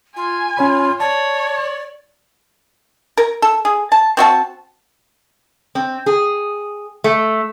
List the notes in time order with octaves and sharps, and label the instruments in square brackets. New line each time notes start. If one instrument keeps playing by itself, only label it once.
[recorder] F4 [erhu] G#5
[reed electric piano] C#4 C#5 B5 [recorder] F4
[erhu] C#5 [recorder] D5 [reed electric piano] A5
[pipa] A#4
A4
G#4
A5
C4 F#4 E5 A5
[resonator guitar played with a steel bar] C4
G#4
A3